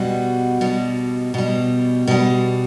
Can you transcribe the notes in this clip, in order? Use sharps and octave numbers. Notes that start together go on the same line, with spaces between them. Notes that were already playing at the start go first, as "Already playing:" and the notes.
Already playing: B2 G3 F#4
B2 G3
B2 G3
B2 G3